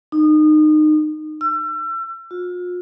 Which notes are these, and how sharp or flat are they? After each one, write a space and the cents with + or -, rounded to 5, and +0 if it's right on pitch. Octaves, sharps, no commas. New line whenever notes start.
D#4 -25
E6 +35
F4 +40